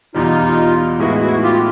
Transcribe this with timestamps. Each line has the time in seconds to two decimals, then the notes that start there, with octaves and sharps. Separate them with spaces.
0.14 E2 B2 G3 D#4 F4
0.99 A2 E3 G#3 B3 D#4 E4 F#4
1.21 E4 F#4
1.43 F4 G4